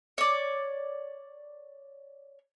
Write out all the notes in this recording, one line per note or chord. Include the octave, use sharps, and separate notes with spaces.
C#5 D5